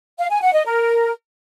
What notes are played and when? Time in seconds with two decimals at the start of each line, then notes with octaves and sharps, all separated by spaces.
0.18 F5
0.30 G#5
0.42 F#5
0.54 D#5
0.65 A#4